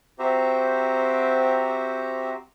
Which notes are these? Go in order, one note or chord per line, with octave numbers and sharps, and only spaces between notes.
C4 F#4 G4 C5 E5 A#5